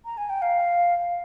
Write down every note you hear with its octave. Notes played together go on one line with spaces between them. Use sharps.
A#5
G#5
G5
F5